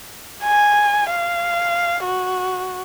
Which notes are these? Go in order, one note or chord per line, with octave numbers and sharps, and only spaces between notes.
G#5
F5
F#4